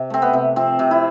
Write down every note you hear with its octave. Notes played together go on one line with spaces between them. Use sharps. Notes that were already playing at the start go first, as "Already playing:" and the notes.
Already playing: C3
A3 C4
B3
C3
F3 C4
C3
E4